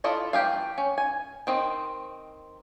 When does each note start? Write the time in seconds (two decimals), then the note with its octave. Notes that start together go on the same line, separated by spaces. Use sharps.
0.04 E4 F4 A4 D5 D#5
0.33 E3 A3 G4 G#4 F5
0.78 C#4
0.98 G#5
1.47 D#3 C4 D#5